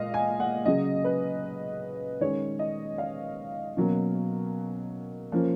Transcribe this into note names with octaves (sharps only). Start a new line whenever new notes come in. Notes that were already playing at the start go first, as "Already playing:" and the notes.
Already playing: A#2 G#3 D#5 F5
G#5
F#5
C#3 F#3 C#4 D#5
B4
D#3 G#3 C#4 C#5
D#5
F5
B2 F#3 A#3 C#4
F3 A#3 C#4